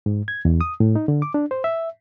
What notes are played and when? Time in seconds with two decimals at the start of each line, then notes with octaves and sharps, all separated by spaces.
0.06 G#2
0.28 G#6
0.45 E2
0.61 D#6
0.80 A2
0.96 D#4
1.08 D3
1.22 D6
1.34 D4
1.51 C5
1.64 E5